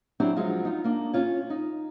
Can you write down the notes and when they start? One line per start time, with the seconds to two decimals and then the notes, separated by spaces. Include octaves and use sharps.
0.20 F#3 C4 D4 E4 G4
0.36 F3 F#3 G#3 F4
0.65 D#4 F4
0.84 A#3 D4
1.13 C#4 F4 C#5
1.50 D#4